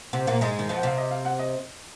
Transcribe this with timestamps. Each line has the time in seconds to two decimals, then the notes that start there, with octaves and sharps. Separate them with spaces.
0.13 C3 C4 F#5
0.27 A#2 A#3 F#5
0.41 G#2 G#3 D#5
0.59 D#3
0.69 F2 F3
0.77 F#5
0.83 C3 C4 F5
0.97 D#5
1.11 F5
1.25 F#5
1.39 D#5